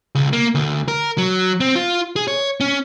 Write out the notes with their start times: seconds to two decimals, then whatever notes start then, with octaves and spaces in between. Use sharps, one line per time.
0.15 C#2
0.33 A#3
0.55 D2
0.88 A#4
1.18 F#3
1.60 C4
1.76 F4
2.16 G#4
2.28 C#5
2.61 C#4